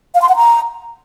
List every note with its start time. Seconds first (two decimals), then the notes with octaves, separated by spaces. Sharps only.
0.15 F5
0.22 C6
0.29 F#5
0.36 A#5